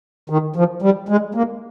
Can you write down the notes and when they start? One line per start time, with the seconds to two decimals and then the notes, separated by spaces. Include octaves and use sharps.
0.30 D#3
0.56 F3
0.82 G3
1.09 G#3
1.35 A#3